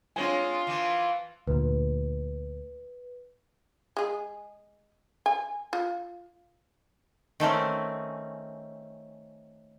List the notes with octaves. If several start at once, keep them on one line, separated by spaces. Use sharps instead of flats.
G#3 C4 D4 F4 C#5 G#5
E3 F3
D2 A#2 B4
G#3 G#4
G#5
F4
D#3 A3 C4 C#4